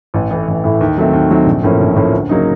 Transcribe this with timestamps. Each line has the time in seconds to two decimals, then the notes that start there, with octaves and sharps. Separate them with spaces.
0.14 A1
0.31 A2 E3
0.48 A1
0.64 A2 E3
0.81 D#2
0.97 D#3 F#3 A3 C4
1.13 D#2
1.30 D#3 F#3 A3 C4
1.46 A#1
1.63 A2 F3 A#3 C#4
1.81 A#1
1.96 A2 F3 A#3 C#4
2.13 D2
2.29 C#3 F#3 A#3 D#4